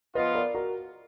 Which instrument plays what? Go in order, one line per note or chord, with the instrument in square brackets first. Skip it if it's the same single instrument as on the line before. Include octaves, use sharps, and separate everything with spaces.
[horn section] F3 B3 F4 [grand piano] B4 D#5
[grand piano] A#4 D5
F#4 A#4